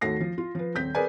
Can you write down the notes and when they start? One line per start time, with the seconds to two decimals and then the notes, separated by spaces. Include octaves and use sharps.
0.01 D#2 A3 F#4 A#6 C7
0.21 F3
0.38 F4
0.55 F3 B4
0.75 D#1 C4 G6 B6
0.95 G#4 A#4 B4 D5 G#5